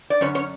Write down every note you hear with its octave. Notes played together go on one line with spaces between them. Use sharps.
D5
F#2 D3 C#4 C#5
C#4 C#5